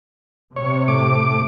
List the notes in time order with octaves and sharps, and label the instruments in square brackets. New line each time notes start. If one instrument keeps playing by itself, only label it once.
[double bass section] C3 [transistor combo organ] C#5
[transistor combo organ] A2 D6